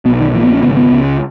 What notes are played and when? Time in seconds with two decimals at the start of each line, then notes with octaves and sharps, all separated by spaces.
0.05 B1 B2 B3
0.20 D#3
0.34 A#1 A#2 E3
0.43 B3
0.53 C#4
0.62 G#1 F#2 C#3 B3
0.77 B3
0.91 C#2 C#3